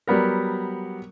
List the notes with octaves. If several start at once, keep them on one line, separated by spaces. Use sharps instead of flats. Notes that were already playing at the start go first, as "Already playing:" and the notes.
F#3 G3 B3 A#4